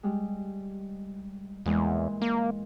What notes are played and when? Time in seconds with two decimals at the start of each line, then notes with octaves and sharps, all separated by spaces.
0.03 G3 G#3
1.66 E2 A#2 E3 G#3
2.22 A#3